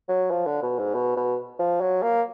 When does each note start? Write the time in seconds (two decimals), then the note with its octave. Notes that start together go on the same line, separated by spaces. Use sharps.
0.09 F#3
0.31 F3
0.46 D3
0.63 B2
0.79 G#2
0.95 B2
1.17 B2
1.59 F3
1.81 F#3
2.02 A#3